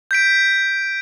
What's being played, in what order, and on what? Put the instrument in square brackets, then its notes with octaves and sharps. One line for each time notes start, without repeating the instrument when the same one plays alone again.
[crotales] G6 B6 D7